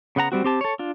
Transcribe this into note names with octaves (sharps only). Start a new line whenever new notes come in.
C#3 B3 F#5 A#5
G3 C4 F#4
C4 G4 A5
A4 C#5
D4 F4